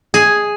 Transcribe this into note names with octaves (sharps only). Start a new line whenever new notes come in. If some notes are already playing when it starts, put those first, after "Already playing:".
G#4